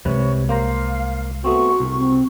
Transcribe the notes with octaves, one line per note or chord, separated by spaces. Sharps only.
C2 C3 G#3 B4 C#5
A#3 C5 F5 A#5
A3 B3 C4 F#4 C#6
C2
C4